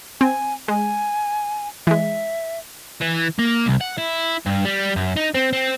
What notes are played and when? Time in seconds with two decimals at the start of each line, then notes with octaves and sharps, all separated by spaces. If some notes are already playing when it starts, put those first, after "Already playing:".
0.21 C4 G#5
0.68 G#3 G#5
1.87 E3 G#3 E5
3.01 E3
3.39 A#3
3.66 C2
3.81 F#5
3.98 E4
4.46 G2
4.65 G3
4.96 F#2
5.17 D#4
5.35 C4
5.53 C4